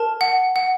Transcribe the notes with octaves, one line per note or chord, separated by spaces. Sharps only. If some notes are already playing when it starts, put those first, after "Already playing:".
Already playing: A#4 A5
F#5
F#5